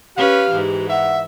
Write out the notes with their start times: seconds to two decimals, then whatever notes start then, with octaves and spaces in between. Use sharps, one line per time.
0.17 C#4 G4 B4 F5
0.50 G#2 E3
0.90 E5 F#5